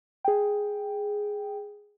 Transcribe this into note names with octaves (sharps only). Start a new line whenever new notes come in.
G#4 G5